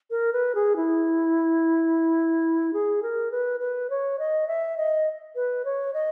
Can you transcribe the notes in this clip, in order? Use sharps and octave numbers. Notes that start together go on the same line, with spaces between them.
A#4
B4
G#4
E4
G#4
A#4
B4
B4
C#5
D#5
E5
D#5
B4
C#5
D#5